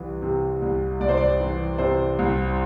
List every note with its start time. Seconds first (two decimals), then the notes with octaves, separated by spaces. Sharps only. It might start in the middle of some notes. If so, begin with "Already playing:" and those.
Already playing: C2 E3
0.22 C3
0.62 C2
1.00 C2 D5
1.09 C5
1.17 D5
1.40 E3
1.78 C3 C5
2.19 C2